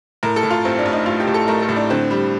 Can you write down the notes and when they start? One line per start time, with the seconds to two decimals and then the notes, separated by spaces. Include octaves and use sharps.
0.23 A2 A#4
0.36 A4
0.43 A2
0.51 F4
0.65 A1 C4
0.79 D4
0.86 A1
0.93 D#4
1.06 A1 F4
1.20 G4
1.27 A2
1.34 A4
1.48 A3 A#4
1.62 A4
1.69 A2
1.76 D4
1.90 D3 C4
2.11 G3